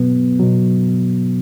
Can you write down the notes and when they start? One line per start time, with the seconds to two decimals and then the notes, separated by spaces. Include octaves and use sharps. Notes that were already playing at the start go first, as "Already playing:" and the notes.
Already playing: B2 F#3 B3
0.40 B2 F#3